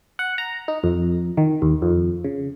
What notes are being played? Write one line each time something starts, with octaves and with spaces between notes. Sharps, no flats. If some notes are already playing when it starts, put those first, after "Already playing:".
F#5
A#5
D#4
F2
D#3
D#2
F2
C#3